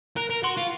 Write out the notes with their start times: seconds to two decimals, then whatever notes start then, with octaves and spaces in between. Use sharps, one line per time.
0.16 A#4 F#6
0.30 A#4
0.43 F#4 C6
0.57 F4